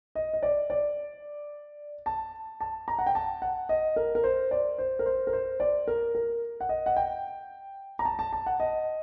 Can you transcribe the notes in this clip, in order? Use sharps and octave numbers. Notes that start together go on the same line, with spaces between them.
D#5
D#5
D5
D5
A5
A5
A#5
F#5
G5
A5
F#5
D#5
A#4
A#4
C5
D5
C5
A#4
C5
A#4
C5
D5
A#4
A#4
F#5
D#5
F#5
G5
A#5
A5
A5
A5
F#5
D#5